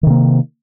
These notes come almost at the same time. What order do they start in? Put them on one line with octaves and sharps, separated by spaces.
D#3 C3 A#3